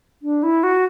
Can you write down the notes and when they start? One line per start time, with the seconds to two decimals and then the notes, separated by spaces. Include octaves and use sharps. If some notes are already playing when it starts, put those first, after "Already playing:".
0.22 D4
0.43 E4
0.63 F#4